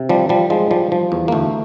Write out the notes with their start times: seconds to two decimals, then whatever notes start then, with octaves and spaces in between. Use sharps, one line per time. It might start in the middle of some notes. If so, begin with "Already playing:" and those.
Already playing: C3
0.09 F3 G3
0.29 F3 G3
0.50 F3 G#3
0.71 F3 G3
0.92 F3
1.12 E2
1.28 A#3
1.32 D2 A3